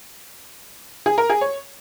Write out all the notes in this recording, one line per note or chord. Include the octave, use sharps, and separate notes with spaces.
G#4
A#4
G#4
C#5